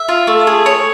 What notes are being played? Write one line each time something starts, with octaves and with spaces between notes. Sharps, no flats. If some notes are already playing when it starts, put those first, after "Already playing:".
Already playing: E5
F4
A3
G#4
C#5